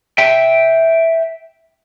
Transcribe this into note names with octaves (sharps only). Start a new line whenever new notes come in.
E5 G5